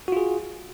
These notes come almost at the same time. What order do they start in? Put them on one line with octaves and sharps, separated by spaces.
F#4 F4 G#4